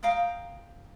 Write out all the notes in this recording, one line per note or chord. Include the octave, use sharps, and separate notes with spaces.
F5 G5 A#5 D#6